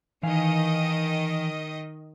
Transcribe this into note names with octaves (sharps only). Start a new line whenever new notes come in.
D#3 E3 D#5 F5 G#5